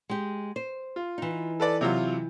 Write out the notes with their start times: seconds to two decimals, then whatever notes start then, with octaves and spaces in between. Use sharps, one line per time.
0.10 G#3 G4
0.56 C5
0.96 F4
1.18 E3 D#4
1.60 A4 B4 D5
1.81 C3 F#3 F4